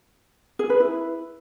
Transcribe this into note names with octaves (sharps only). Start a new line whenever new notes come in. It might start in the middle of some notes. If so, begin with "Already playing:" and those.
G#4
B4
E4